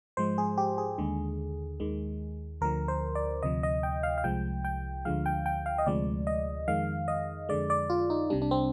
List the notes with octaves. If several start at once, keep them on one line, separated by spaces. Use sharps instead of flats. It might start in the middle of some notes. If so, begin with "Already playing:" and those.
G#2 F3 G#3 C5
G#4
G4
G#4
D#2 D3 G#3
D#2 D#3 G#3
D2 D3 F3 A#4
C5
D5
D2 C3 F3 D#5
D#5
G5
F5
F5
C2 C3 F3 G#3 G5
G5
D2 D3 F3 G#3 F5
G5
G5
F5
D#5
D2 C3 F3 G#3 D5
D#5
F2 D#3 G#3 F5
D#5
F2 D3 G#3 D5
D5
F4
D#4
C2 C3 G3 D4
D4
C4